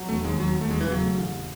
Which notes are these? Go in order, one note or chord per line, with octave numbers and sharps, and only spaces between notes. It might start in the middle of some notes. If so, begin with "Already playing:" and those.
Already playing: F#3
E1 A3
D#2 G#3
D#2 F#3
F#3
A3
E1 G#3
E3
C#3 F#3
A3
A1